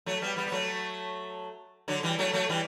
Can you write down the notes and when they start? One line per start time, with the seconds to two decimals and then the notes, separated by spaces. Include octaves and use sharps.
0.06 F#3 A3
0.22 G3 B3
0.36 G3 B3
0.47 B3
0.52 F#3 A3
1.88 D3 F#3
2.03 E3 G3
2.19 F#3 A3
2.33 F#3 A3
2.49 E3 G3